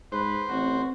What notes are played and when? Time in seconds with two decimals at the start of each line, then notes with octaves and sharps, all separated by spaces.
0.12 G#2 B4 C5
0.49 A1 C4 F#4